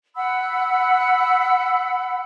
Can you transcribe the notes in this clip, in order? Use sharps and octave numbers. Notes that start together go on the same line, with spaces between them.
F#5 B5 E6